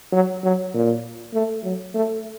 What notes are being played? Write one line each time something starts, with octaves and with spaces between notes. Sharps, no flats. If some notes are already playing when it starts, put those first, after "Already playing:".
F#3
F#3
A#2
A3
F#3
A3